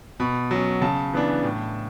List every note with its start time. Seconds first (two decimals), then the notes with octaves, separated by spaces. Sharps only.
0.20 B2 B5
0.51 F#3 C#4
0.81 C#3 A5
1.14 E3 B3 D4
1.44 A2